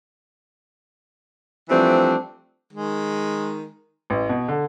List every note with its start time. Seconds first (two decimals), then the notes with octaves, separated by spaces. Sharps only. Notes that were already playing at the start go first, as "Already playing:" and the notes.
1.69 E3 F3 G3 A3 C4 D4
2.73 D#3 G#3
4.10 A1
4.29 B2
4.48 D3